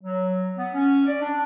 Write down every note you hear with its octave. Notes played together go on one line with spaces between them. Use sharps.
F#3
B3
C#4
D5
D4